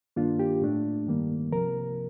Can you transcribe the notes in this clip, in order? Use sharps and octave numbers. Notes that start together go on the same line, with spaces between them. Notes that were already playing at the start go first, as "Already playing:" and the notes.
G2 D#3 A#3 D4 F4
G4
A2 A3 D4
G2 D#3 G3 A#3
C2 C3 F3 A#4